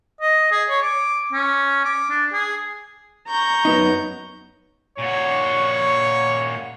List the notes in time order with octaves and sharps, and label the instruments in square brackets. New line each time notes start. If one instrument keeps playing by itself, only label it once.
[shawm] D#5
G#4
C#5
D6
C#4
D6
D4
G#4
[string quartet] A#5 C#6 G6
[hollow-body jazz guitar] F#2 B3 D#4
[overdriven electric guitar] A#2 F#4 [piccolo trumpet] C#5